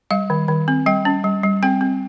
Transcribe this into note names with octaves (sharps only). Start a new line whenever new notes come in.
G3 F5
D#3
D#3
C4
G3 G5
C#4
G3
G3
C4 G5
C4